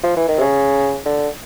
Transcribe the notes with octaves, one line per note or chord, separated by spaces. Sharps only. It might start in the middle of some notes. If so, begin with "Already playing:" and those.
F3
E3
D#3
C3
C#3
D3